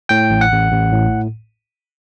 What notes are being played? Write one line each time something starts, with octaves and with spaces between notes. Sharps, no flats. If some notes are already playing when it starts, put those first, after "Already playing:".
A2 G5
A1
F#5
A1
A1
A2